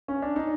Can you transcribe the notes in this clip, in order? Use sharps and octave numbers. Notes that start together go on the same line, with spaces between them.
C#4
D4
D#4